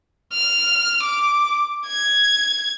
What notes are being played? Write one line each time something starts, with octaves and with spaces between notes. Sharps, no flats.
F6
D6
G#6